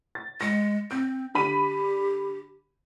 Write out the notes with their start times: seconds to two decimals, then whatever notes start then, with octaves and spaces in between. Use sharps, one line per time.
0.15 A6
0.41 G#3 A#6 C#7
0.91 C4 G6
1.35 D3 G4 B5 D#7